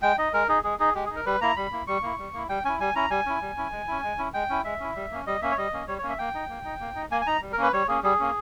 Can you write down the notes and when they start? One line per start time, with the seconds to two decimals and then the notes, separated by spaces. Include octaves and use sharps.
0.02 G#3 G5
0.18 D#4 D#5
0.33 G#3 A#4
0.49 D#4 G#4
0.64 G#3 G#4
0.80 D#4 G#4
0.95 G#3 G4
1.06 G#4
1.11 D#4
1.16 A#4
1.26 G3 B4
1.41 A#3 E4 A#5
1.56 G3 B5
1.72 A#3 E4
1.87 G3 C#6
2.03 A#3 E4
2.18 G3
2.33 A#3 E4
2.49 G3 G5
2.65 C#4 E4 G#5
2.80 G3 G#5
2.96 C#4 E4 A#5
3.10 G3 G#5
3.26 C#4 E4
3.42 G3
3.57 C#4 E4
3.72 G#3
3.88 C#4 E4
4.03 G#3
4.18 C#4 E4
4.34 G#3 G5
4.50 C#4 E4
4.64 G#3 E5
4.80 C#4 E4
4.96 G3
5.11 A#3 C#4
5.27 G3 D#5
5.42 A#3 C#4 E5
5.51 C#5
5.57 G3 D#5
5.73 A#3 C#4
5.88 G3 C#5
5.98 C#5
6.03 A#3 C#4
6.09 E5
6.19 A#3 G5
6.35 D#4
6.49 A#3
6.65 D#4
6.80 A#3
6.95 D#4
7.11 A#3 G#5
7.21 G#5
7.27 D#4 A#5
7.42 G3
7.52 A#4
7.58 A#3 C#4 B4
7.73 G3 C#5
7.88 A#3 C#4 G#4
8.03 G3 G#4
8.20 A#3 C#4